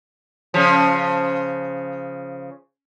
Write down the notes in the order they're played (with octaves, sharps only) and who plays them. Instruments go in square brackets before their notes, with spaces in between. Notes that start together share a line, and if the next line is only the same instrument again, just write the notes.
[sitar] C#3 F3